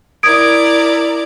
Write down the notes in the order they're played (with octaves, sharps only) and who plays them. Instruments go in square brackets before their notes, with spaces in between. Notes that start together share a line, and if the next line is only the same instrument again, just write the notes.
[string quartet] E4 A#4 D5 [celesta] D#6 G#6 D7